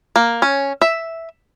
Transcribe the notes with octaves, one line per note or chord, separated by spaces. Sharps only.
A#3
C#4
E5